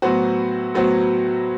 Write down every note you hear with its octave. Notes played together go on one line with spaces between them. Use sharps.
A2 F#3 B3 F#4 C5
A2 F#3 B3 F#4 C5